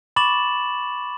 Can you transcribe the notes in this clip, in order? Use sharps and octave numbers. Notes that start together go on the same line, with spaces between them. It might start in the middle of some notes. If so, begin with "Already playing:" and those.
B5 C#6 D6 A6 E7 F#7